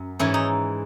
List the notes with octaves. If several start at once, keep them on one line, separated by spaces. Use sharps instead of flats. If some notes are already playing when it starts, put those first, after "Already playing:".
Already playing: F#2
G#2 E3 C#4 E4
D#4